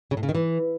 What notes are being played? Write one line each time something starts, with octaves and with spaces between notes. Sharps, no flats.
C#3
A2
C#3
D#3
E3